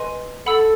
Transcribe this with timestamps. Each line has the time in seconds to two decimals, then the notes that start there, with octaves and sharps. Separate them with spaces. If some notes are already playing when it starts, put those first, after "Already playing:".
Already playing: B4 D#5 G#5 C6
0.46 A4 F#5 B5 E6